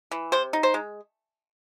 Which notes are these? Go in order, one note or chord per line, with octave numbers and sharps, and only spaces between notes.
E3
C3 C5
D#4
C5
G#3